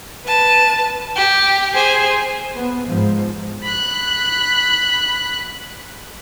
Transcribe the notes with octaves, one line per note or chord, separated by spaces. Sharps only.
B4 A5
G4
G#4 C5
B3
G#2 F3
B5 F#6